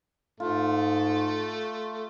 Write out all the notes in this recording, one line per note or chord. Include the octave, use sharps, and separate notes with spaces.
G#2 A3 F4